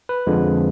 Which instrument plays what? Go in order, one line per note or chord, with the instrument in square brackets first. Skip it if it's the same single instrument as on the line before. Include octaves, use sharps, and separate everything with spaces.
[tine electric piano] B4
F2 D3 F3 G#3